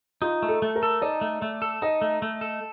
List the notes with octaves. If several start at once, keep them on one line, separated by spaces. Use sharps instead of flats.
D#4 F4
A3
A4
A3
A#4
A4
D#4 D5
A3
A3
A4
D#4 D#5
A3
A3
A4